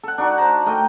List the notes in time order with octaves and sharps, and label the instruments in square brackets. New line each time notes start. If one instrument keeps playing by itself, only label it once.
[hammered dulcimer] A4 F#5
D4 D#4 F#4
C5 A5 A#5
A3 A#4 D#5 G5